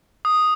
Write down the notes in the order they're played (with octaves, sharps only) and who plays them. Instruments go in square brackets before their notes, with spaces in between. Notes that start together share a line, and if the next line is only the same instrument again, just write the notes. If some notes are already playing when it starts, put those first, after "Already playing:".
[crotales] D#6